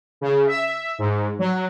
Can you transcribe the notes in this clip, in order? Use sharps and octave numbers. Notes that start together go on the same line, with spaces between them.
C#3
E5
G#2
F#3